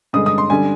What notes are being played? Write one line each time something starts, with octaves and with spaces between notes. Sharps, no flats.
G2 D3 G#3 D#6
D#6
C6
D3 G3 G#5